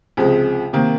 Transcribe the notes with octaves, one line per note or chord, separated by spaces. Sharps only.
C#2 C3 F3 G#3
C3 D#3 A#3